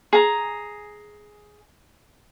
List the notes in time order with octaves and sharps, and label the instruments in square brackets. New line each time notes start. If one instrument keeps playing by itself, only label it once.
[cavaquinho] G#4 A#5